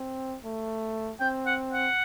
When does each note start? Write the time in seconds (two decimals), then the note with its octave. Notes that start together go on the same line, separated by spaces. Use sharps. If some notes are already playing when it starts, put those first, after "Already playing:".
Already playing: C4
0.44 A3
1.20 C4 G5
1.46 F#5
1.72 F#5